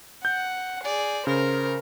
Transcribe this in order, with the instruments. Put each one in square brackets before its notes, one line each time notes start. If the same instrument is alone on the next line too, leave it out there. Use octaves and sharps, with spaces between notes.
[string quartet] F#5 [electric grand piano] G6
[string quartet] G#4 [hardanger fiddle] D5
[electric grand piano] C#3 [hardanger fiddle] A#4 [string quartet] C5